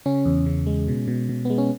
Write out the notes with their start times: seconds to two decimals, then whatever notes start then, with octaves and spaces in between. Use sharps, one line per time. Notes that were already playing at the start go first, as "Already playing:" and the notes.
0.06 C#3 C#4
0.25 E2
0.46 C#3
0.67 G#3
0.88 B2
1.08 B2
1.29 B2
1.45 G#3 B3
1.58 C#4